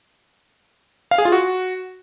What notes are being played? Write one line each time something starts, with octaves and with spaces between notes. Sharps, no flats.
F5
G#4
F4
F#4